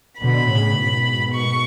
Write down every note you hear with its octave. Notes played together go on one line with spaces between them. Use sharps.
B2 D3 B5
A2 C#3
G#2 B2
C#6